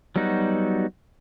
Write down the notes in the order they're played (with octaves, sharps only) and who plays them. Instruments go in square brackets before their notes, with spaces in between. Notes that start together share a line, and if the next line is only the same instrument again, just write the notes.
[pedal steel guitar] F#3 G3 B3 D#4 F#4